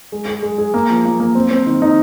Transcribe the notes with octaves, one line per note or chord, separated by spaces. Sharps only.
G#3
G#4
G#3
G#4
A#3
F3
A#3
A#3
C4
C4
D#3
D#4